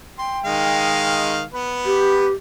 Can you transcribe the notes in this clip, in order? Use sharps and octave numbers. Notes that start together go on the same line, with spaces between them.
G5 C6
D#3 G#3 F5
B3 B4
G4